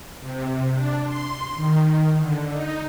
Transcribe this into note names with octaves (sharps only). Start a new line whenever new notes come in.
C3
D4
C6
D#3
D3
D#4